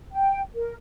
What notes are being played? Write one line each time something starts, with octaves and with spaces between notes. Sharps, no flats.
G5
A#4